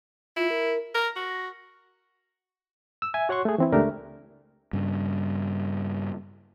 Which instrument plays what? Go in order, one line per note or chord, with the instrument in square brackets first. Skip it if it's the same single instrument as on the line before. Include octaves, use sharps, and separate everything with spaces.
[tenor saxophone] E4 [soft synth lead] F4
[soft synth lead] A#4
[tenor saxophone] A#4 [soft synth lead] A#6
[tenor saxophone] F#4
[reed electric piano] E6
E5 G#5
F#4 C#5 F#5 C6 C#6
A3 G#4
E3 C4 E4
C#2 A3 D4 G4 A#4
[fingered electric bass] G2 C#3